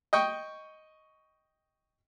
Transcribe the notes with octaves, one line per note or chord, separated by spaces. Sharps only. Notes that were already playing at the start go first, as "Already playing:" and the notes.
D#5 G5 C#6